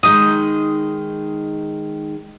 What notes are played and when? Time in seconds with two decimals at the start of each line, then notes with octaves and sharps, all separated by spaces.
0.03 D#3 G#3 D#4 D#6